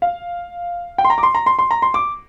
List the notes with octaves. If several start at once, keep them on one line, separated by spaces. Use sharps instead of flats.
F5
G5
C6
A#5
D6
C6
A#5
C6
C6
A#5
C6
D6